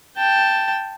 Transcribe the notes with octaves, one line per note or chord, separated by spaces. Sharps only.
G5 A5